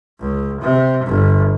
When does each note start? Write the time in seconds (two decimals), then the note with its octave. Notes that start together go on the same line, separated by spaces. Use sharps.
0.20 C#2
0.61 C3
1.05 G1